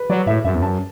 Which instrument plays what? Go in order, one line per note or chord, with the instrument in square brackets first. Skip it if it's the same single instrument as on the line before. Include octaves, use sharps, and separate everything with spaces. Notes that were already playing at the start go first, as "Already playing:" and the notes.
Already playing: [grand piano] B4
[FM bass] F#3 [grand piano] D5
[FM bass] A2 [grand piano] E5
[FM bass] F#2 [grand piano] E5
[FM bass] E2
[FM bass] F#2 [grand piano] A5